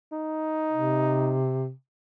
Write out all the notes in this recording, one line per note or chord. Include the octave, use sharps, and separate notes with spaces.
D#4
C3